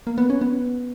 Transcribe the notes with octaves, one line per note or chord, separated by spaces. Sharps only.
A#3
B3
C#4
B3